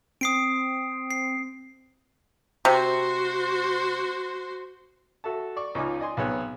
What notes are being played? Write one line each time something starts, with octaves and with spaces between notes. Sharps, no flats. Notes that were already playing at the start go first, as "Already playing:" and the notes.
C4 D#6 C7 D7
C7
C3 F#4 C5
F#4 A4 E5 A5
D5 C#6
C#2 C#3 D#4 F4 G#5 D6
D5 D#5 G#5 C6
B1 C3 B3 G#4 C#5